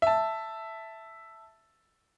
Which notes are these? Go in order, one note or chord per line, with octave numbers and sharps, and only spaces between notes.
E5 A5